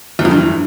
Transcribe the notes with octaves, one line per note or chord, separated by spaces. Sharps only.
E2
F2
G2
E3